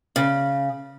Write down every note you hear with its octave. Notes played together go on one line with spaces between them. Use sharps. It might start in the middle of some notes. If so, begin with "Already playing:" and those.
C#3